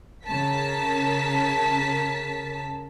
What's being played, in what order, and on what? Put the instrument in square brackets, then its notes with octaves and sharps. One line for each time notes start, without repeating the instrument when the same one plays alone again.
[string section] C#3 A#4 A5 B6